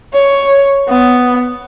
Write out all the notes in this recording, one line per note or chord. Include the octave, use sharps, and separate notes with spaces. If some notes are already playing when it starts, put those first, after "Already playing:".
C#5
B3